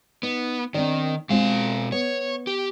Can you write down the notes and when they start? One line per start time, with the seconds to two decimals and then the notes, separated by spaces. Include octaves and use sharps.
0.23 B3 D#4
0.74 D#3 C4 D4 D5
1.29 B2 G#3 C4 F4 F5
1.92 B3 C#5
2.47 G4